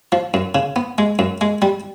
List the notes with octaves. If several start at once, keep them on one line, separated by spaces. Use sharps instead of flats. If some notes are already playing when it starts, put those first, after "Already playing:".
F3
F#2
C#3
B3
G#3
F#2
G#3
G3